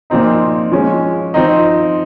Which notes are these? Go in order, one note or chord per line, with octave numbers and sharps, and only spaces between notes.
A#2 F3 C4 D#4
F3 G#3 C#4
F3 C4 D#4